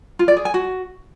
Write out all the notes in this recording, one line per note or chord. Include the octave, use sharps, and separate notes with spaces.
F4
D5
G#4
G#5
F#4